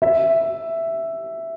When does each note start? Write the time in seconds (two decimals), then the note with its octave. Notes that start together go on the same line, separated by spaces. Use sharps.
0.02 E5